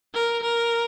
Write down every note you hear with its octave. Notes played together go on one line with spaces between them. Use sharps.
A#4
A#4